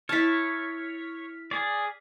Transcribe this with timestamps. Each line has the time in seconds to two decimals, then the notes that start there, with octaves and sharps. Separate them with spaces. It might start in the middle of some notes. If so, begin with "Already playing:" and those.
0.09 E4 C#5 A5 F6 B6
1.51 G#4 D5